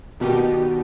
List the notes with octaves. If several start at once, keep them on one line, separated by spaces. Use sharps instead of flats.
B2 D#3 G3 B3 D#4 G4